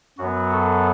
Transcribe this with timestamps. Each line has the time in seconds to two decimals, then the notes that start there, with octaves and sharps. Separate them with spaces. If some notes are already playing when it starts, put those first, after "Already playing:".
0.18 F#2 F#3 B3 F#4
0.52 A4